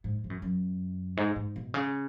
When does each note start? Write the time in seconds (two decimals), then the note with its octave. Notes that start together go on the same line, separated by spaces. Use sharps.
0.04 G#2
0.24 G#2
0.30 F#2
0.42 F#2
1.17 G#2
1.36 G#2
1.56 B2
1.74 C#3